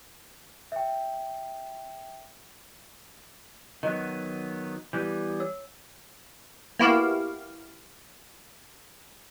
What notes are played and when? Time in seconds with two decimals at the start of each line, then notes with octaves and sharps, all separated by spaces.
0.72 E5 G5
3.83 D#3 F#3 B3 D#5
4.93 E3 G3 B3 G6
5.40 C#5 E6
6.79 A#3 B3 E4 F#4 G4 F5